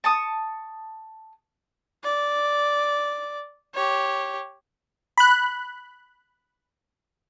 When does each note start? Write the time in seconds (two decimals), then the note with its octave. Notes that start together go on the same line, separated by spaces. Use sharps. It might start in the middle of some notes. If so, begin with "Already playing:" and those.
0.04 A5 C#6 D#6
2.04 D5
3.75 G4 C#5
5.18 B5 F#6